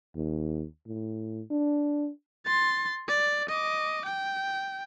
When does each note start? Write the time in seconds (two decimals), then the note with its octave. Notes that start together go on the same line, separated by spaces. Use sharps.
0.16 D#2
0.87 A2
1.51 D4
2.45 C6 A6
3.08 D5
3.49 D#5 D6
4.05 G5